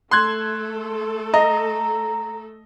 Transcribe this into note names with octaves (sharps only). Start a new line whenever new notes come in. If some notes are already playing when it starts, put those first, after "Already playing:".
A3 A4 C6 F#6 G#6
D#5 A#5